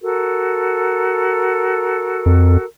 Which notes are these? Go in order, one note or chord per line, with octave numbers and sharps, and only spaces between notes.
F#4 A4 A#4
F2